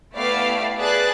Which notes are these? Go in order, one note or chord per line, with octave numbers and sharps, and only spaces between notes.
A3 B3 E4 G4 D5 F5
G#4 B4 D5 A5 F#6 A6